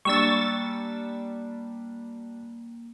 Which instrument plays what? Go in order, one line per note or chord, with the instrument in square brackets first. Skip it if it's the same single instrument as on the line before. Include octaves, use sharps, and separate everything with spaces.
[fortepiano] G3 D4 [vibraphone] A#3 [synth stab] C#6 E6 A6